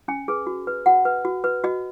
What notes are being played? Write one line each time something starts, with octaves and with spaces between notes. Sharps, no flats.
C#4 G#5
G#4 B4
F#4
B4
F#4 F#5
B4
F#4
B4
F#4 D#5